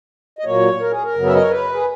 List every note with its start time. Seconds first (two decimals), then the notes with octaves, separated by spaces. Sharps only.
0.39 D#5
0.45 A#2 F#3 A#3 C#5
0.80 A#4
0.91 G#4
1.03 A#4
1.15 F#2 C#3 F#3 B3
1.26 E5
1.35 D#5
1.41 C#5
1.50 B4
1.74 G#4